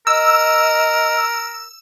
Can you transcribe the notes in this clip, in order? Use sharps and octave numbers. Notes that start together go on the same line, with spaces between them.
A#4 D#5 E6